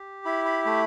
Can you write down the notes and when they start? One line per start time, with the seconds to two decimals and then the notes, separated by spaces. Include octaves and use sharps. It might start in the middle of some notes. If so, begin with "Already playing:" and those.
Already playing: G4
0.25 E4 B5
0.45 B5
0.66 A3 B5